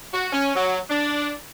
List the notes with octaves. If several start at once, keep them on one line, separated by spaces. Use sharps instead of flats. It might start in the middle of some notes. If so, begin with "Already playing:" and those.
F#4
C#4
F#3
D4